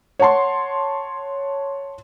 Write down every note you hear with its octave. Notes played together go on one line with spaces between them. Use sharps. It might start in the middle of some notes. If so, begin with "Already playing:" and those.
C#5 F#5 A5 C6